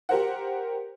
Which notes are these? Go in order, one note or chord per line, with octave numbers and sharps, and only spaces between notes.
G4 A#4 C5 F#5